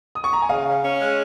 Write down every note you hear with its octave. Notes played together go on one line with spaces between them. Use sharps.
D#6
C#6
A#5
G#5
C#3 F5
C#4
C#4
G#3